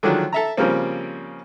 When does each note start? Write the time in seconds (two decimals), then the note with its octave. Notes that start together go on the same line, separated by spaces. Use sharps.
0.03 D3 D#3 F3 F#3 G#3 D4
0.33 A4 E5 A#5
0.57 C#3 F3 G3 A#3 C4